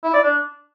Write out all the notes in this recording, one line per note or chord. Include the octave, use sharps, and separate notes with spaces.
E4
D5
D4